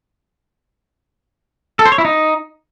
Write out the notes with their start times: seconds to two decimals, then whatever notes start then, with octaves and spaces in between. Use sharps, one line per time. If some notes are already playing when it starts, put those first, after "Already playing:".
1.79 A4
1.86 C5
1.92 C#5
1.98 E4
2.05 D#4